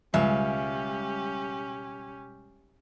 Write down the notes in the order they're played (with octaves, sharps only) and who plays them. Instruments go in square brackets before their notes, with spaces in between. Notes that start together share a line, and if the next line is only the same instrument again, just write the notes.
[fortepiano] C#2 [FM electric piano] B2 G3 G#3 [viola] C#4 G4 [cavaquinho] E5 F5